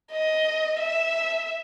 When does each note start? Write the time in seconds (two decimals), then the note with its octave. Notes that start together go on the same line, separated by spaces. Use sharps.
0.12 D#5
0.80 E5